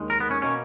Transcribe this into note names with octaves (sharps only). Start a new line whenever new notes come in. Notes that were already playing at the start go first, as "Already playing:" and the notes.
Already playing: D#2 D#3 G#3
A#4
B3
C#4
B2 A#3 C#4